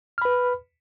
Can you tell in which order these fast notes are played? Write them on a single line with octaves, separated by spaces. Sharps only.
F6 B5 B4